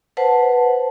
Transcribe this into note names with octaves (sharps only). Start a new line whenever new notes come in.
B4 C5 F#5 A5